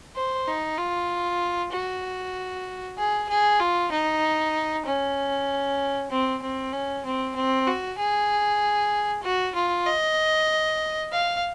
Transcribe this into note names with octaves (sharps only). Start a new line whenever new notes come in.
C5
D#4
F4
F#4
G#4
G#4
F4
D#4
C#4
C4
C4
C#4
C4
C4
F#4
G#4
F#4
F4
D#5
F5